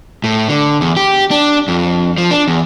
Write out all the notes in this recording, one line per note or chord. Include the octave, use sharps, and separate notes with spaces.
A2
D3
E2
G4
D4
F2
F3
D4
E2